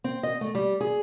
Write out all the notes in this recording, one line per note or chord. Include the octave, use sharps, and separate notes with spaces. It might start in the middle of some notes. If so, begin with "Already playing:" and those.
C4
D#5
A3
G3
G#4